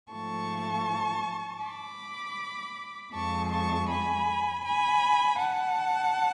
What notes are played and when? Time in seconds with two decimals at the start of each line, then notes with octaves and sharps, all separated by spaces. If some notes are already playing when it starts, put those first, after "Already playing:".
0.12 G#2 F3 A3 A5 C#6
1.62 B5 D6
3.13 F2 F3 G#3 A5 C#6
3.51 A5 C#6
3.89 G#5 B5
4.65 G#5 B5
5.40 F#5 A5